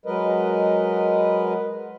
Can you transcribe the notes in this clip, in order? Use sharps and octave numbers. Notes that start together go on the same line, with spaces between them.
F#3 G#3 A#4 B4 D#5